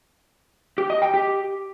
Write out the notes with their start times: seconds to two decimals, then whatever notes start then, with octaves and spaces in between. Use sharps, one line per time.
0.78 G4
0.90 D#5
1.02 G5
1.14 G4